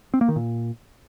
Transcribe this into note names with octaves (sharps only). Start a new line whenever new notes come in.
C4
A#3
D#3
A#2